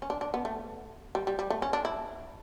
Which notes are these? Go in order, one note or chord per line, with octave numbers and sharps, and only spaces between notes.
C#4
D4
D4
B3
A3
G3
G3
G3
A3
C#4
D4
E4